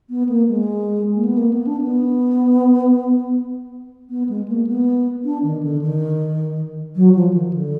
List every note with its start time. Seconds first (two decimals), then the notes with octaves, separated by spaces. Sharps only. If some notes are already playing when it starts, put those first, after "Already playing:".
0.10 B3
0.29 A#3
0.48 G#3
1.15 A#3
1.25 B3
1.38 A#3
1.53 B3
1.67 D4
1.81 B3
4.10 B3
4.29 G#3
4.48 A#3
4.67 B3
5.25 D4
5.43 D#3
5.63 D3
5.81 D#3
6.96 F#3
7.15 F3
7.33 D#3
7.53 D3